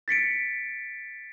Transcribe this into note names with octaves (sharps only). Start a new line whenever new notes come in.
A6 B6 C#7 D7